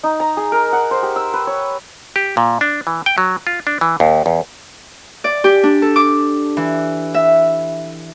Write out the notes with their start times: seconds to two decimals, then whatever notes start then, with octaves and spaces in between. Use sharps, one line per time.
0.03 D#4
0.20 A#5
0.37 G#4
0.52 A#4
0.73 F#5
0.91 C5
1.03 G4
1.16 E6
1.34 B4
1.47 C#5
2.16 G4
2.37 A#2
2.61 D4
2.87 E3
3.06 G5
3.18 F#3
3.47 F4
3.67 D4
3.81 E3
4.00 D#2
4.26 E2
5.24 D5
5.44 G4
5.63 D4
5.82 A4
5.96 D6
6.57 E3
7.14 E5